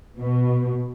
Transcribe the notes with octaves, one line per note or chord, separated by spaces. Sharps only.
B2